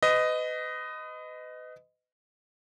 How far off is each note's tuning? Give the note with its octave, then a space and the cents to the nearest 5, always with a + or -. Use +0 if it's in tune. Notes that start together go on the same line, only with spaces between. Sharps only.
B4 +35 D#5 +0